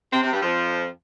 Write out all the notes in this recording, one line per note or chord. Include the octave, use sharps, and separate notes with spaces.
C3 C4
C3 C4
G2 G3
F2 F3